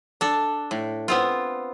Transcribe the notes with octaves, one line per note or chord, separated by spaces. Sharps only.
D4 A4
A2
B3 C4 F4